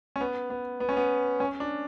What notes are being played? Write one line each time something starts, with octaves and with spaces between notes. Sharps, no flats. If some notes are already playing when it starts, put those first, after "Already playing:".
C#4
B3
B3
B3
C#4
B3
C#4
D4